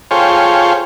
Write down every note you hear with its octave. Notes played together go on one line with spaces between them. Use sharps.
F4 G#4 A4 C5 C#5 G5